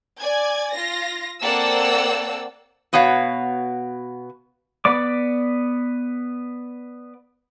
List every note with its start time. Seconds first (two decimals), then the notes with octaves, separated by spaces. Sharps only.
0.20 D5 G#5 G#6
0.72 F4 A#6
1.42 A#3 C4 A4 D5 F#5 E6
2.93 B2 B3 F#4 C#5 F5
4.85 B3 D5 D6